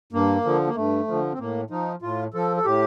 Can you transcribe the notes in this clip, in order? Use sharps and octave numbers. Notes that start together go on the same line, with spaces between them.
G2 A#3
D3 F3
A#3
G2 A3
D3 F3
C4
A2 A#3
F3 D#4
A2 F4
F3 A4
A4
A2 G4